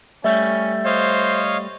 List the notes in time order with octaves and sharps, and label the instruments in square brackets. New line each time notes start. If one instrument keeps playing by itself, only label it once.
[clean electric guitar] G3 A3 [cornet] C#4 [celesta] E5
[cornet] C5 [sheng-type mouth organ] C#5 D#5 F5